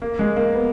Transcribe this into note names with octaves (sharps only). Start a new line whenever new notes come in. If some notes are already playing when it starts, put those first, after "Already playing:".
A#3
G#3
A#3
B3